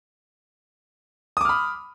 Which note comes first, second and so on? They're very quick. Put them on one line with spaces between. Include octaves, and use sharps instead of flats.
D#6 D6 F6 B5